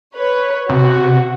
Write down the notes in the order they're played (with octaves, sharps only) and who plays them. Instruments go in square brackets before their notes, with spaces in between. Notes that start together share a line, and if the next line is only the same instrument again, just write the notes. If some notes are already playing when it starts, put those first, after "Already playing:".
[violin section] B4 C#5
[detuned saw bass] C3 [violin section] F#4